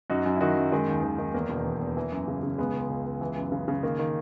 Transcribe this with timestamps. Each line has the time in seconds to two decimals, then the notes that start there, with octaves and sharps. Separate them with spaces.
0.10 F#2 D#4 F#4
0.26 F#2
0.36 E4
0.41 D#3 D#4 F#4
0.56 F#2
0.72 D#3 G#3
0.87 D#2
1.03 D#3
1.18 D#3
1.34 E2 A#3
1.50 E1
1.65 E2
1.81 E2
1.97 E3
2.12 F#2
2.28 C#3
2.43 C#3
2.58 C#2 G#3 B3
2.74 C#2
2.90 C#2
3.06 C#2
3.21 E3
3.37 F#2
3.52 C#3
3.68 C#3
3.83 D#3 A#3
3.99 D#3